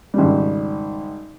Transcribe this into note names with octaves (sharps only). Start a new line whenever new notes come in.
G#1 C#3 G3